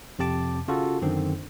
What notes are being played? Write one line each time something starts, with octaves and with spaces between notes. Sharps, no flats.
F2 C3 G4 A5 D6
C#3 F4 F#4 A4
F#2 D3 D#3 C4